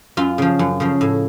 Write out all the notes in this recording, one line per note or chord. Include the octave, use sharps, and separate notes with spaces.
F#2 F4
C#3 F3
F#2
C#3 F3
A2